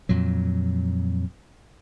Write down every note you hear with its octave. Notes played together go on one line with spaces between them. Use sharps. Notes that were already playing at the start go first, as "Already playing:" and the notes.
F2 A#2 F#3